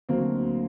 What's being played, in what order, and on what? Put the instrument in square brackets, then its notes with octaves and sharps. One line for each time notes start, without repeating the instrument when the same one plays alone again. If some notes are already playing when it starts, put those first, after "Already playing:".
[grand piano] D2 D3 F#3 A#3 C4